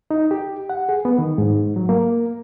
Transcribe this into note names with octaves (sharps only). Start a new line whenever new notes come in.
D#4
G4
F#5
G#4
B3
D#3
G#2
F#3
A#3